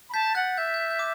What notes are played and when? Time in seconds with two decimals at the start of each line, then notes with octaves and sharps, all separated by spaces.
0.09 B5
0.13 A5 G6 B6
0.35 F#5 F#6 A6
0.57 E5 G6
0.74 G6
0.90 G6
0.99 D6